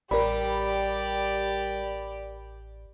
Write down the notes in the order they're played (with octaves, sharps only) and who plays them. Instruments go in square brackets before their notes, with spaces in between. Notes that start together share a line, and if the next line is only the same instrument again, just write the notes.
[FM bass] A1 [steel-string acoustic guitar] G3 [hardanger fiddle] G4 D5 [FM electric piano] A#4 B5